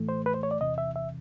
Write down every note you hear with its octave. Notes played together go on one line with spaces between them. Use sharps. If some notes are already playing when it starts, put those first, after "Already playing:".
Already playing: A2 E3 A3
C5
B4
C5
C#5
D5
E2 C3 E3 D#5
E5
E5